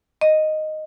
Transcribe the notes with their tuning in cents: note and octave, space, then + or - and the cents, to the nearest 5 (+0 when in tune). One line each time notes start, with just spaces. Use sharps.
D#5 -5